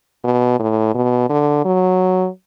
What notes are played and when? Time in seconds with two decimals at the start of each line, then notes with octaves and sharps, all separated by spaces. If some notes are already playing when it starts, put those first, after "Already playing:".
0.24 B2
0.59 A2
0.95 B2
1.29 D3
1.65 F#3